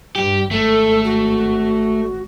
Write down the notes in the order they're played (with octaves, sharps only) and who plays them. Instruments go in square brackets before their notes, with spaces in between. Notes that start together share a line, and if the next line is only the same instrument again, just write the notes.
[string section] G2 [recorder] G3 [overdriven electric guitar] G4
[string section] G#1 [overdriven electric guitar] A3 [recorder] A4
[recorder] F#4